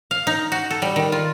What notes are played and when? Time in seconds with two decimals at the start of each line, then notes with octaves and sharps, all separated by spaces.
0.11 F5
0.27 D#4
0.52 F#4
0.71 A4
0.82 G3
0.96 D#3
1.12 F4